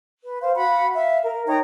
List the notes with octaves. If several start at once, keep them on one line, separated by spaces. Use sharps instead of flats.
B4
C5 F5
F#4 F5 F#5 B5
E5 F5
A#4
D#4 C#5 G5 A#5